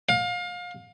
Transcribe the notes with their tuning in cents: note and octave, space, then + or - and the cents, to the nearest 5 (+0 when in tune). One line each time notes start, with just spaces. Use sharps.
F5 +30